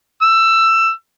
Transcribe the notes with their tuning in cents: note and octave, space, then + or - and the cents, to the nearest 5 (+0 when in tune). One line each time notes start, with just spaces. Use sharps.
E6 +15